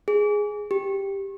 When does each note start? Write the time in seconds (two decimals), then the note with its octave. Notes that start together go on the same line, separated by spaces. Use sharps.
0.08 G#4
0.71 G4